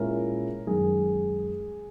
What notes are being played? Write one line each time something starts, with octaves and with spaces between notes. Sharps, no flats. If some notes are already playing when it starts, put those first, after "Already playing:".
Already playing: A#2 G#3 C#4 E4 A#4
F#2 D#3 G#3 G#4